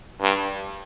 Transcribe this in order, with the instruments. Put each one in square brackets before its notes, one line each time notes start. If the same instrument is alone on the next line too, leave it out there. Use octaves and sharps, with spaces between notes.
[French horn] G2